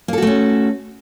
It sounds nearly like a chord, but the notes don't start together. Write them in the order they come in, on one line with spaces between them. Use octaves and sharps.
A#3 A4 F#4 A3 C#4